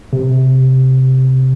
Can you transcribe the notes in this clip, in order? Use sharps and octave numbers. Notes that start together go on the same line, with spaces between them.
C3